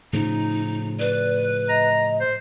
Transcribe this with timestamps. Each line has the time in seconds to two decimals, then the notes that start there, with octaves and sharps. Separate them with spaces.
0.13 A2 C#3 F3 D#4
0.99 B4 D5
1.69 D#5 A#5
2.20 C5